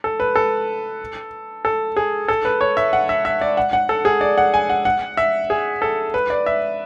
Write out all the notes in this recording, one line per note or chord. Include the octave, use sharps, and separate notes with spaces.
A4
B4
A4
A4
G#4
A4
B4
C#5
E5
F#5
E5
E5
D5
F#5
F#5
A4
G#4
D5
F#5
G#5
F#5
F#5
E5
G#4
A4
B4
D5
E5